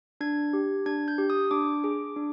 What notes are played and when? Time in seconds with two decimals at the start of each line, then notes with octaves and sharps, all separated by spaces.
0.21 D4 G#6
0.53 G4
0.86 D4 G#6
1.08 G6
1.18 G4
1.30 D#6
1.51 D4 D6
1.84 G#4
2.16 D4